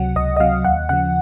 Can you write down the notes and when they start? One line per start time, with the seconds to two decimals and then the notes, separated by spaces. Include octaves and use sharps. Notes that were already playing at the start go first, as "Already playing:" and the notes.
Already playing: C#2 C3 F#3 F#5
0.15 C#2 D#5
0.36 D#5
0.40 C3 F#3 F5
0.65 D#2 F#5
0.89 C#3 F3 F#5